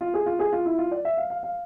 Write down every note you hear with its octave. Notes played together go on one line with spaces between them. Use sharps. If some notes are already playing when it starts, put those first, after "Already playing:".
F4
G#4
F4
G#4
F4
E4
F4
D5
E5
F5
F5
F5